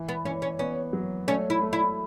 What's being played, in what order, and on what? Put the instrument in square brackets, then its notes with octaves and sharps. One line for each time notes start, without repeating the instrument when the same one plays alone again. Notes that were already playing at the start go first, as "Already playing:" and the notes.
Already playing: [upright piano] E3
[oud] B3
[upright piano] E3 [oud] C#4
[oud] C#4
[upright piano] B3 [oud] C#4
[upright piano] F#3
[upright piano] A3 [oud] C#4
[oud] E4
[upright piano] A3
[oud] E4